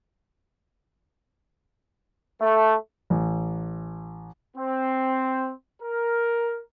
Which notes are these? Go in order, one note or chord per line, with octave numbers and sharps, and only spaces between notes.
A3
A1
C4
A#4